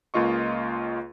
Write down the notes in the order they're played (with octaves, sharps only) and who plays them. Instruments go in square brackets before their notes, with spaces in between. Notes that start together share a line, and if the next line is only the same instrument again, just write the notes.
[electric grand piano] C#2 A#3 F4 D#5 C#6